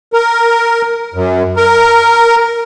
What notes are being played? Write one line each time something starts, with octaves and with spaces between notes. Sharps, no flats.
A#4
F#2
A#4